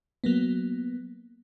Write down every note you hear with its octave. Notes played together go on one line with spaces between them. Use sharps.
F#3 A#3 B3